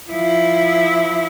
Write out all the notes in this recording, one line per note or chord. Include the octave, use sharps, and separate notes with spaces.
F3 E4